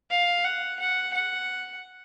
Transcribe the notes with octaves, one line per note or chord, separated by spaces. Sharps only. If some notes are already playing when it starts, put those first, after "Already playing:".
F5
F#5
F#5
F#5